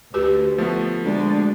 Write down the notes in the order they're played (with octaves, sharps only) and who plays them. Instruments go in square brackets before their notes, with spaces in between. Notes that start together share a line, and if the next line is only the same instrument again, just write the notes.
[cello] D2 [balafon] F#4 G4 B4
[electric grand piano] F3 A3 B3
[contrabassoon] D2 [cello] G#3 D4